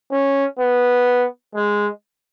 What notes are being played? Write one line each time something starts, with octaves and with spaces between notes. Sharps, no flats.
C#4
B3
G#3